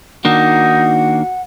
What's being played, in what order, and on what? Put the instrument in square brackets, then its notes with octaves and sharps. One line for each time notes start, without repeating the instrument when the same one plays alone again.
[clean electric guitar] D#3 A#3 D4 [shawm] D#4 [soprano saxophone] F#4 [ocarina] F#5